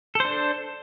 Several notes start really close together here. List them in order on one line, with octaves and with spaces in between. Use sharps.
A4 C5 D4